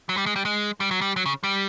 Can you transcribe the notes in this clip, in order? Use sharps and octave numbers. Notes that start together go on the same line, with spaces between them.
F#3
G3
G#3
G3
G#3
G3
F#3
G3
F#3
C#3
G3